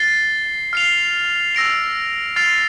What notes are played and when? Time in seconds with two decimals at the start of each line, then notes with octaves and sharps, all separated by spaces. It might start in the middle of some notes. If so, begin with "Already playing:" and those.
Already playing: A6 C7 G7
0.73 F6 C7 F7
1.55 E6 A#6 D7 F7
2.36 F6 A6 C7 F7